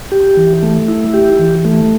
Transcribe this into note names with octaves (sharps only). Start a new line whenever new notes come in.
G4
E3
A3
E4
G4
E3
A3